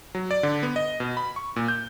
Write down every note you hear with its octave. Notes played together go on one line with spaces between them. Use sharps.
F#3
D5
D3
B3
D#5
B2
B5
C#6
A#2
G6